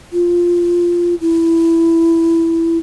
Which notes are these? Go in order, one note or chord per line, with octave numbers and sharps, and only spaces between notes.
F4
E4